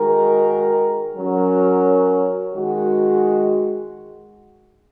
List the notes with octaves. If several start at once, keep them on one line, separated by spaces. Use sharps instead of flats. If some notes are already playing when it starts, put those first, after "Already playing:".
Already playing: D#3 G#3 F#4 A#4
F#3 C#4 A#4
D#3 G#3 F#4